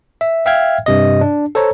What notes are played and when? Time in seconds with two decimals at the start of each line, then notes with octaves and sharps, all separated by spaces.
0.21 E5
0.46 E5 F5 G5 F6 G#6
0.86 G2 C3 D#5
1.21 D4
1.55 A4 C5 C#5 A#5